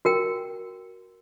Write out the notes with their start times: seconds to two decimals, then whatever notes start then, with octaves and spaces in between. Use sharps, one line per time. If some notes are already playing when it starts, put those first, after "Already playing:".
0.05 F#4 A#4 G5